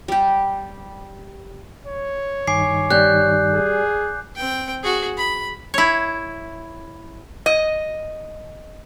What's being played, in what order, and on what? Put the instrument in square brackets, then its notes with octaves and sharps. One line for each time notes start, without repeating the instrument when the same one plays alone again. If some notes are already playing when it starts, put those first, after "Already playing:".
[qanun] G3 G4
[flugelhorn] C#5
[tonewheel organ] G2 D#3 [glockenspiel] G#5 D6 C7
[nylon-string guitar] G3 [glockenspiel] F#6 G6
[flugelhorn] G#4
[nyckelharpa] C4 G5
F#4 G#4
B5
[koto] E4 C#5
[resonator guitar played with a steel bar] D#5